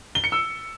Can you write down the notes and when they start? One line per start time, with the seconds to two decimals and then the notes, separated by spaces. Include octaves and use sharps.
0.15 G7
0.24 C#7
0.32 E6